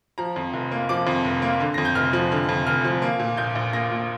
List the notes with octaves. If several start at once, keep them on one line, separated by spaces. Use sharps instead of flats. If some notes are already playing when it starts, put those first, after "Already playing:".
F3 A#5
F2
F1
A#3
F3 D6
F2
F1
A#3
D3
F2 A#6
G6
F1 F6
F3
D3
F2
F1 F6
F3
A#3
A#2
A#1 G6
A#1
A#3 A#6
A#2